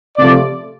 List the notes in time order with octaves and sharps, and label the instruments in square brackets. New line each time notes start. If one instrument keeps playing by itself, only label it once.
[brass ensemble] C3 F3 A3 D5